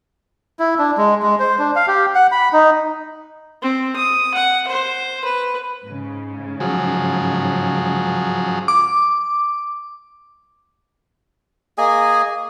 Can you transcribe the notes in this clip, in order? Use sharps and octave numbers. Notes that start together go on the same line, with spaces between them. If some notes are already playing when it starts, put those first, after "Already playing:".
E4
D4
G#3
G#3
C5
D4
F5
G4
F#5
B5
D#4
C4
D#6
F#5
C5
B4
G#2 C#3
F3 F#3 G#4
D6
A#3 G#4 D#5 G#5